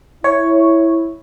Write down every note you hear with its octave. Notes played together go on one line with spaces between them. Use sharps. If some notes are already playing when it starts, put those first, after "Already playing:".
E4 C#5